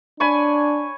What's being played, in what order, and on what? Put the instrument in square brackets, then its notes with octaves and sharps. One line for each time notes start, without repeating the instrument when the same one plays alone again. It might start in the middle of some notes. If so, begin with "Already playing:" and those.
[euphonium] D4 [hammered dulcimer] C#5 G#5 B5